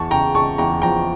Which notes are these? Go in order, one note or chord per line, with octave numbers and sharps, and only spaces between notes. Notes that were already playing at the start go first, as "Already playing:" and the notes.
Already playing: E2 A5 C#6
C#3 G5 A#5
C#3 A5 C#6
E2 G5 A#5
F3 G5 A#5